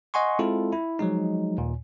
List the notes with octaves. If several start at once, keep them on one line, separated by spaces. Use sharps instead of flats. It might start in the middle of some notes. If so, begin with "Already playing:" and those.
D#5 F#5 G#5 C6 C#6
G#3 C4 E4 F4 A4
E4
F3 F#3 G#3 D#4
D#2 A#2